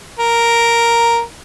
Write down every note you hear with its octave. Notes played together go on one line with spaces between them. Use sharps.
A#4